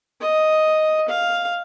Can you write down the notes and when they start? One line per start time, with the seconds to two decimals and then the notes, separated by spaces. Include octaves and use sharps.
0.20 D#5
1.08 F5